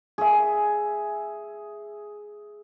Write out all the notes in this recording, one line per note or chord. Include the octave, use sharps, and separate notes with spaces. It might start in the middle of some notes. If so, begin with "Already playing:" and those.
G#4 E5